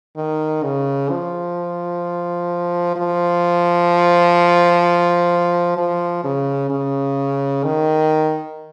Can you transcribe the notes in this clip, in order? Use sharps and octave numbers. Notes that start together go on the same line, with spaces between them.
D#3
C#3
F3
F3
F3
C#3
C#3
D#3